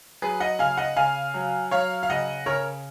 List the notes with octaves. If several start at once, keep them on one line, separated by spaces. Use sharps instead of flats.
F#3 G#4 B4
D#5 F#5
C#3 F5 G#5
D#5 F#5
C#3 F5 G#5
F#3
F#3 C#5 F5
F5
C#3 D#5 F#5
C#3 A#4 C#5